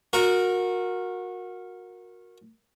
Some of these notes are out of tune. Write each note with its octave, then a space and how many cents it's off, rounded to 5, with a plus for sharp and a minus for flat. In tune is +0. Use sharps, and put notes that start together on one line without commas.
F#4 -25 A#4 +0